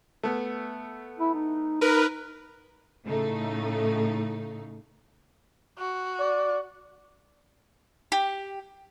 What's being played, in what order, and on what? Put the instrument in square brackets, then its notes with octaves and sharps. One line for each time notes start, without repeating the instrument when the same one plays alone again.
[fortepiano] A3 B3
[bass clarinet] E4
D#4
[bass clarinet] D#4 [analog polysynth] A#4 B4
[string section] A2 C#3 A3 D#4
[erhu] F#4
[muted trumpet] D5
[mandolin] G4